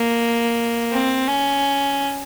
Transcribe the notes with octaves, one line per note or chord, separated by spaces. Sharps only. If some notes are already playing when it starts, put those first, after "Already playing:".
Already playing: A#3
C4
C#4